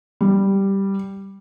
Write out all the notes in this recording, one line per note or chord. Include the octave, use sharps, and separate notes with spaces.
G3